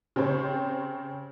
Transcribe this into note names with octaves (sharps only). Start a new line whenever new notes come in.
C#3 C4 G4 C5 C#5